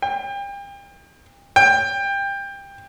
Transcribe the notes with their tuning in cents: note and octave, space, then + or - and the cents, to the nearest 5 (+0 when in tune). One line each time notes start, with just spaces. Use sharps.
G5 +35
G5 +20